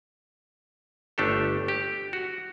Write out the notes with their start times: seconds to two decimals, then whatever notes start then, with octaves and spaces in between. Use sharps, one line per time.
1.18 G1 A3 D4 G4 A4
1.68 G4
2.13 F#4